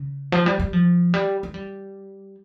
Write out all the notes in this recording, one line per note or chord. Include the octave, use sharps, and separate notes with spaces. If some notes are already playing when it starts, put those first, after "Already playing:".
Already playing: C#3
F3
G3
G3
F3
G3
G#3
G3